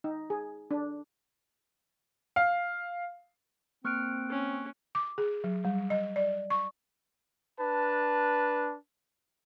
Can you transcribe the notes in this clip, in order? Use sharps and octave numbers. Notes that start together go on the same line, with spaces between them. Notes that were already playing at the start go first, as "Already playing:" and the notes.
D#4
G#4
D4
F5
A#3 C4 C#6 F6 F#6 D7
C#4
D6
G#4
F#3
G3
D#5
D5
C#6
D4 B4 A5